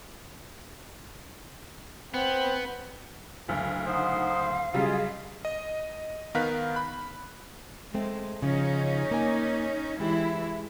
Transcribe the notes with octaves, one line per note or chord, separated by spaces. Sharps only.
B3 C4
F#1 D2 F5 F6
D#4 C5 F5 F#5 D#6
C#3 F#3 G3 F4 G#4 D#5
D#5
D#3 B3 A#4 F5 F#6 B6
B5 F#6
G#3 A3 C4
C#3 F3 C#4 D#4
A#3 G#5
E3 G#3 E4 G4